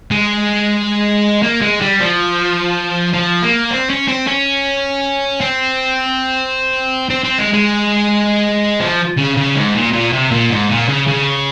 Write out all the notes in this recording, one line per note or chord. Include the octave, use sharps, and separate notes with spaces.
G#3
A#3
G#3
G3
F3
F3
A#3
C4
C#4
C4
C#4
C4
C4
C4
G#3
G#3
F3
C#3
C#3
G#2
A#2
A#2
C3
A#2
G#2
A#2
C#3
C#3